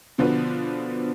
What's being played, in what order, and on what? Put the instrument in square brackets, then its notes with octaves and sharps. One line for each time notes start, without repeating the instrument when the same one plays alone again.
[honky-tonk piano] B2 D3 F3 D4 F#4 B4